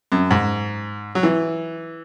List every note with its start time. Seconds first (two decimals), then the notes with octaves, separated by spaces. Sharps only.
0.12 F#2
0.31 G#2
1.15 F#3
1.23 E3